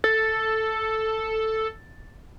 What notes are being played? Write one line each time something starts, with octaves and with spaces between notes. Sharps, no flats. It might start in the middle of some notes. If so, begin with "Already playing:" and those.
A4 A6